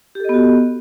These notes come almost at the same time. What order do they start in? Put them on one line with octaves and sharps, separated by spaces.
G4 A4 D#5 B3 F#4